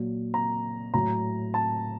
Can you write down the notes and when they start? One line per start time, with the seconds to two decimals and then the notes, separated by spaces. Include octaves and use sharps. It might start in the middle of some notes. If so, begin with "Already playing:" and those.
Already playing: A#2 F#3
0.34 A#5
0.94 A2 F#3 A#5
1.54 A5